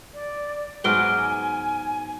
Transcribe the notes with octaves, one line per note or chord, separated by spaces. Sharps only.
D5
G#2 F#3 B3 G#5 F6 D7 G7